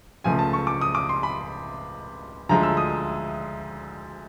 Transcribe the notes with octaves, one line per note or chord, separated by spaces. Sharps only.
C#2 C#3 F3 A3 G#5
A5
C#6
D6
D#6
D6
C6
B5
D2 D3 F3 G#3 A#5
E6
D#6